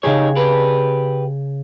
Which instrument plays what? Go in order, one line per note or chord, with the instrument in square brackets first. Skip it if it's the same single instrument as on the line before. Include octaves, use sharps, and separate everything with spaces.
[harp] C#3 G#4 [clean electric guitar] D#4 G4 C#5
[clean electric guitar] G4 B4